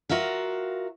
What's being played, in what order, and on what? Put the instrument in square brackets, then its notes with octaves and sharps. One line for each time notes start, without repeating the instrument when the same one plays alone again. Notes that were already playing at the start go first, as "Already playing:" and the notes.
[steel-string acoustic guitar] F4 F#4 A#4 E5 F5